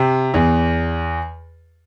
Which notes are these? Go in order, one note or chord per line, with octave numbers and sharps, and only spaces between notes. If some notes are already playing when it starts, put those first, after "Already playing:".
Already playing: C3
E2